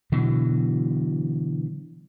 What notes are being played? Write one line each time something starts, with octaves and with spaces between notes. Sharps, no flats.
B2 D3 E3 F#3